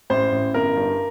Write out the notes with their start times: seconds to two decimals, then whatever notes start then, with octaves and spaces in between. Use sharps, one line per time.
0.10 A1 C5
0.32 A1
0.54 G1 A#4
0.76 G2